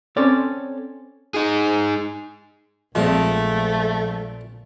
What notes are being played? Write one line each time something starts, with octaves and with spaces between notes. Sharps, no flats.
C4 C#4 A4 C#5 D5
D#4 G#4
A#1 A#2 F3 G#3 A3 C4